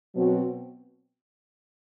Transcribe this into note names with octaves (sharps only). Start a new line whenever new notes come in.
B2 F#3 C4 F#4